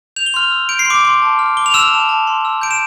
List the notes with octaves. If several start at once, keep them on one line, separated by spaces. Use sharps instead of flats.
G6 F7
G7
C6 F6 F7
E6
G6 D7
C7
C6 D6 D7
C6
A5
F6
D6 G7
F7
E6 F6 E7
A5
A5
C6
E6
G6 D7
E7